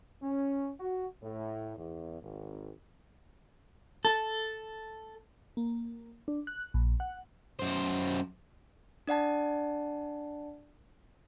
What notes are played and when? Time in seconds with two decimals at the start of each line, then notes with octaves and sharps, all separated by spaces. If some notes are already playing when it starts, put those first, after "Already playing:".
0.23 C#4
0.80 F#4
1.23 A2
1.78 E2
2.22 G#1
4.05 A4
5.57 A#3
6.28 D4
6.47 F#6
6.74 A#1
7.00 F#5
7.59 F#2 C5
9.07 D4 D5 F#5 A5